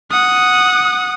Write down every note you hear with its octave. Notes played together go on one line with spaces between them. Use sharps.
F#5 D#6